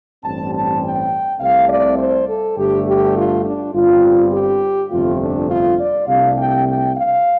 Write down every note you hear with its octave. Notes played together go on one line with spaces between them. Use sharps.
A1 G2 G3 C4 A5
A5
G5
C2 C3 A3 C4 F5
D5
C5
A4
G1 G2 D3 A3 D4 G4
G4
F4
D4
G1 G2 G3 C4 F4
G4
G1 F2 C3 A3 F4
D4
F4
D5
C2 C3 A3 D4 F5
G5
G5
F5